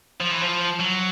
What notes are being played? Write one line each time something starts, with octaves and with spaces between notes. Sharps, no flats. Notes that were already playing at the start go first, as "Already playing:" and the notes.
F3
E3
F3
F#3